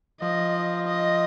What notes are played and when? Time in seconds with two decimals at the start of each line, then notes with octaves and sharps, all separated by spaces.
0.21 F3 D#5
0.87 D#5